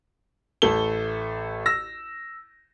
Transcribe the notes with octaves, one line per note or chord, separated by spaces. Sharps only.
A1 A3 A4 G7
E6 A#6